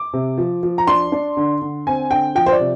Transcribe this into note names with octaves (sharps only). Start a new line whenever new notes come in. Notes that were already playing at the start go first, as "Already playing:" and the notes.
Already playing: D6
C3
F3
F3
A#5
D4 C6
D4
D3
D3
C4 G#5
D3 G5
F3 G5
C5
D5
C3